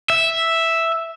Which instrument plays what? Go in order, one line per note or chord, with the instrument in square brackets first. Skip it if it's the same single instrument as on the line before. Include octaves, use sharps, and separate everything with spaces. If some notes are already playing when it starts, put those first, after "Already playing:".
[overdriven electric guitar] E5